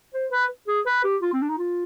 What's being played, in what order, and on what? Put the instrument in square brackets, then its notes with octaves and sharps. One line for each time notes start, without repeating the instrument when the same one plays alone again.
[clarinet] C5
B4
G#4
B4
G4
F4
C4
D4
D#4
F4